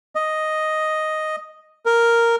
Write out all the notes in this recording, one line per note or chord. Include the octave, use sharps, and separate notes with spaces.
D#5
A#4